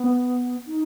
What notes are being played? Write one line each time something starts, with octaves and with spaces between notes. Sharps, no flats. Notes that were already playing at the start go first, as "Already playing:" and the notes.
Already playing: B3
D#4